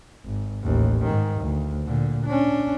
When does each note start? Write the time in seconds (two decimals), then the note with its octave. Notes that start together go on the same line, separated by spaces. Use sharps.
0.25 G#1
0.63 A1 D#2
1.04 G#2 D#3
1.40 D2
1.86 A#2 D3
2.25 C#4 D4